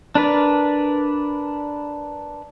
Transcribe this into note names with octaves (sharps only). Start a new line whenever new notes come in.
D4 A#4 B4 D5